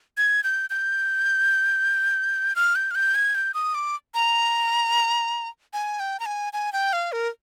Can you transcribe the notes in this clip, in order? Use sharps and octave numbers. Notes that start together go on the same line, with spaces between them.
G#6
G6
G6
F6
G6
F6
G6
G#6
G6
D#6
D6
A#5
G#5
G5
A#5
G#5
G#5
G5
F5
A#4